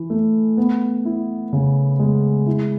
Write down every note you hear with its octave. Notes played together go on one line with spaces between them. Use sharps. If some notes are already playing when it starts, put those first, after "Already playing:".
Already playing: E3
A3
B3
E4
C#3
G#3
E4